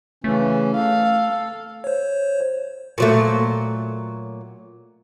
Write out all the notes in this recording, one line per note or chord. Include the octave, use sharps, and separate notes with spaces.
C#3 E3 A3 C#4
A4 F5
C5 C#5
A#2 F#3 A3